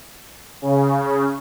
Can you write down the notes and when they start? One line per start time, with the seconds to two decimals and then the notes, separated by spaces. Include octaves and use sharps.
0.62 C#3